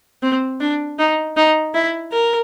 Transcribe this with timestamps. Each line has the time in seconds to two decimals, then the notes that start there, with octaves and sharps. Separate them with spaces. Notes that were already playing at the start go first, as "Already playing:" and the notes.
0.23 C4
0.60 D4
0.99 D#4
1.37 D#4
1.74 E4
2.12 A#4